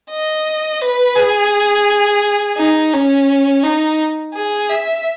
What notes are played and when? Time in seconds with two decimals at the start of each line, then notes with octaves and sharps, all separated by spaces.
0.10 D#5
0.81 B4
1.16 G#4
2.57 D#4
2.92 C#4
3.63 D#4
4.34 G#4
4.69 E5